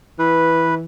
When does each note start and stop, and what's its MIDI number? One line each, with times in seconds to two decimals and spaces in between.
0.19 0.85 52
0.19 0.75 71